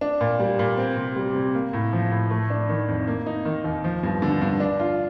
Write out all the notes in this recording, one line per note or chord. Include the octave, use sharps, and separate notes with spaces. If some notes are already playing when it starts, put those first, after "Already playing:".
D4
A#2
G3
A#2
C4
C3
G3
C3
A#3
A2
F3
A2
A3
D4
D#3
F2
A#3
D#4
D#3
D#2
F3
G2
D3
G2
D4
F4